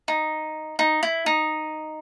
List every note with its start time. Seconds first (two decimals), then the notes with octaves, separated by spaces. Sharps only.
0.08 D#4
0.79 D#4
1.03 E4
1.26 D#4